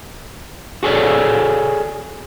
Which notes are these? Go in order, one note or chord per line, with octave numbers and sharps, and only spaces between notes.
F#4 G#4 A4 C#5 D5